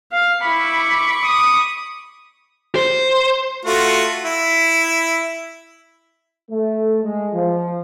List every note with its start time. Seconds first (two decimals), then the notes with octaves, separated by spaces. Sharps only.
0.12 F5
0.46 E4 B5 C#6 D6
1.24 D#6
2.75 C5
3.66 A3 F4 F#4
4.24 E4
6.51 A3
7.03 G#3
7.34 F3